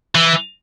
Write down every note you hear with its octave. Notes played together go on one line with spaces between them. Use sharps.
E3